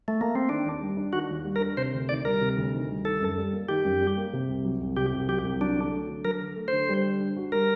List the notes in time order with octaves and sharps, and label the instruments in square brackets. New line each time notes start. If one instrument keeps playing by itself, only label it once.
[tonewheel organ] A3
A#3
C4
[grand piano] D#3 [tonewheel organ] D4
[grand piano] D#2
G3
D4
[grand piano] D#3 [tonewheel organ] F#4
[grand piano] D#2
G3
[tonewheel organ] A#4
[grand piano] D4
[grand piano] C3 [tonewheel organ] C5
[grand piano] D2
[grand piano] D#3 [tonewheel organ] D5
[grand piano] G3 [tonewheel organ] A#4
[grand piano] C3
D2
D#3
G3
[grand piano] D#3 [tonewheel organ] A4
[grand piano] F#2
G3
A#3
[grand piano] D#3 [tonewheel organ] G4
[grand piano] F#2
G3
A#3
C3
C2
F#3
C2
[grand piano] C3 [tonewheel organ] G4
[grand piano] C2
[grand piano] F#3 [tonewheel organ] G4
[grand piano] C2
[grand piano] F#3 [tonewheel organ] D4
[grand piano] D3
A3
D3
[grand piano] F#3 [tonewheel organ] A#4
[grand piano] D3
A3
[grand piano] D3 [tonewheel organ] C5
[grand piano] G3
D3
D4
F#4
[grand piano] G3 [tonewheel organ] A#4